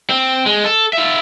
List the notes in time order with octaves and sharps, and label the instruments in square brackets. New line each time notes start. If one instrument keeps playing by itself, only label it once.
[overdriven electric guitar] C4
G#3
A4
F4 E5